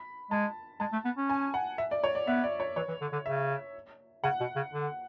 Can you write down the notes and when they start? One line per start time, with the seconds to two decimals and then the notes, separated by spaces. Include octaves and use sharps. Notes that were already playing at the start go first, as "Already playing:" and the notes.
Already playing: B5
0.31 G#3 A5
0.80 G#3 A5
0.93 A3
1.05 B3
1.17 C#4
1.29 G#5
1.54 F#5
1.78 E5
1.91 D5
2.04 C#5
2.15 D5
2.27 B3 E5
2.44 D5
2.60 C#5
2.76 E3 C#5
2.88 E3
3.01 D3
3.13 D3
3.25 C#3 E5
4.24 C#3 F#5
4.40 B2
4.56 C#3
4.73 D3